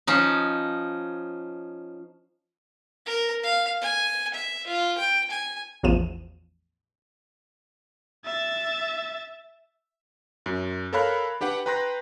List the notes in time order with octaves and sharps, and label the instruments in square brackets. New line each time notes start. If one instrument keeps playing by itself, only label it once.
[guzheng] F3 C#4 D#4
[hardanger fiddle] A#4
F5
G#5
E5
F4
G5
G#5
[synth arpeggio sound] A1 E2 F3 D#7 E7
[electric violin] E5 A6
[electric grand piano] F#2
A4 A#4 C#5 F5 B5 F#6
D4 G4 B4 F#5
B4 G5 A#5 C6 F#6 A#6